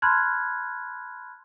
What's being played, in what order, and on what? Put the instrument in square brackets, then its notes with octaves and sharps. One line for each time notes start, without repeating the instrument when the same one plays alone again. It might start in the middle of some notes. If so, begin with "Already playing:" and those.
[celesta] A5 B5 C6 F6 F#6 G#6